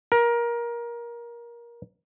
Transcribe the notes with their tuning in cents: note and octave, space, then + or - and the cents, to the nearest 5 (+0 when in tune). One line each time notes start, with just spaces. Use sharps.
A#4 +20